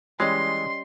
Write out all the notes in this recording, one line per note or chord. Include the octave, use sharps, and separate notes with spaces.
E3 G3 G#3 C#4 D#5 C6